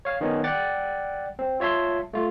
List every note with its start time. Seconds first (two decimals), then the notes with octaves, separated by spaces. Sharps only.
0.05 C#5 F5
0.21 D#3 B3 C#4 D#4
0.44 D5 F#5 G5 A6
1.39 C4
1.60 F4 C#5 E5 A5 C6
2.13 A3 F4